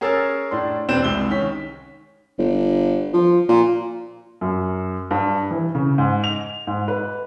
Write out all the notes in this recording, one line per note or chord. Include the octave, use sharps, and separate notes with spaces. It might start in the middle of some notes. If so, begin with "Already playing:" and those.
C#4 G#4 A#4 C#5 E6 A6
A2 D4 C6
E1 C4 D4 B4 E7
C2 G#3 G7
D#3 C#4 B6
G1
F3
A#2
F#2
G2
E3
C#3
G#2
F7
G#2
B4